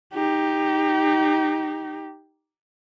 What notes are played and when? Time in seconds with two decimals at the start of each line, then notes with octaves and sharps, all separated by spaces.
0.14 D#4 G4